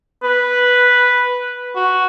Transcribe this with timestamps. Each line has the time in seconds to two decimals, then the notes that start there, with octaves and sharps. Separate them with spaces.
0.23 B4
1.76 F#4